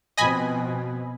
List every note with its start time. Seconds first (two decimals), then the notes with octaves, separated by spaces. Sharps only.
0.17 B2 F3 C4 D#5 G#5 B5